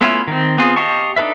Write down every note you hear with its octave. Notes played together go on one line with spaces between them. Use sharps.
A3 B3 C#4 E4 F4
D#3 C4
B3 C4 F4 G#4
G4 D#5 F5 A5 C#6
D4 D#4 A4 B4 E5